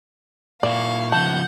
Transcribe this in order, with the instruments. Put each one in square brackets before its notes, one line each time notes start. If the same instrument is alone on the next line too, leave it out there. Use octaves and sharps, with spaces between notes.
[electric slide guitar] A#2 A#3 E4 [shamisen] D5 [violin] F5 C#6
[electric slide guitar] C#3 F3 E4 [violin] F#5 [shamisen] A5 [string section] G6